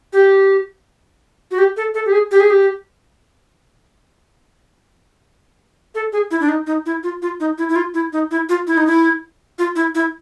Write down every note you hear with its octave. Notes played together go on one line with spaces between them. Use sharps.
G4
F#4
G4
A4
A4
G4
G#4
G4
G#4
G4
A4
G#4
E4
D4
D#4
D#4
E4
F4
F4
D#4
E4
E4
F4
E4
D#4
E4
F4
E4
D#4
E4
F4
E4
E4